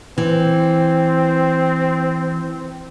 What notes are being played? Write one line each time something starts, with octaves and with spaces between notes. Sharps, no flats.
E3 C4